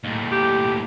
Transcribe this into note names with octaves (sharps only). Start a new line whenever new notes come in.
D#2 A2
G4